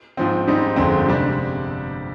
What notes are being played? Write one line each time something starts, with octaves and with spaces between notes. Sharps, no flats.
G#2 F3 C4
G#2 G3 C4 D#4
G1 F2 D3 G#3 C4
C3 G3 D4